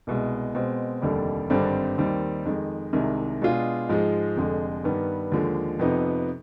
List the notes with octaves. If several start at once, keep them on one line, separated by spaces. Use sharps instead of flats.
C2 B2 G#3
B2 G#3 C4
F1 D#2 D3 G3
G#1 G2 D3 G3 C4
D#2 D#3 G3 C4
F2 D#3 G#3
C2 C3 D#3 G#3
B2 G#3 D4 F4 G#4
G#2 F3 G#3
F1 F2 D3 G#3
G2 D#3 G3 B3
D#2 D3 F3 G#3
F2 C3 F3 B3 D#4